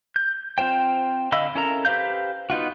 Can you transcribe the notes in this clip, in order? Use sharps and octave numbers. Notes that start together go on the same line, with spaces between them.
G6
C4 F4 C5 G5
D3 D#5 F5 B5 E6
C#4 E4 A4 A#4 A#5
G4 B4 C5 F5 G6
B3 D#4 F4 F#4